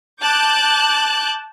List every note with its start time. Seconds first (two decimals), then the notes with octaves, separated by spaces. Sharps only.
0.21 A5 D6 F#6 G6